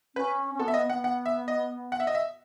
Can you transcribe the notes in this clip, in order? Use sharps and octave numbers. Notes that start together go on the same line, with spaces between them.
C#4 B4
C#4
B3 A4
E5
B3 D#5
F#5
B3
F#5
E5
D#5
F#5
E5
D#5
E5